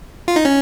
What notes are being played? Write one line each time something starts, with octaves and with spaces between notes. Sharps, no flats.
F4
D#4
C#4